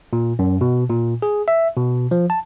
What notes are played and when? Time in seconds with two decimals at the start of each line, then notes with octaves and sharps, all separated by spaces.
0.13 A#2
0.39 F#2
0.61 B2
0.90 A#2
1.22 G#4
1.48 E5
1.76 B2
2.11 F3
2.30 A5